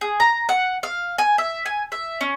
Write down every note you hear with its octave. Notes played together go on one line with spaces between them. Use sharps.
G#4
A#5
F#5
F5
G#5
E5
G#5
E5
C#4